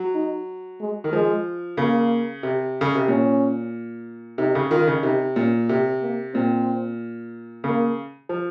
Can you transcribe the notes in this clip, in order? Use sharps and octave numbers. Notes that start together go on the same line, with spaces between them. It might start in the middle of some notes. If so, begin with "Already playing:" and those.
Already playing: F#3
D#4
G#3
D#3
F3 G#3
C#3 A#3
C3
C#3
C3
A#2 C#4
C3 D#4
C#3
D#3 F4
C#3
C3 D#4
A#2 C#4
C3 C4
A#3
A#2 C4
C#3 A#3
F3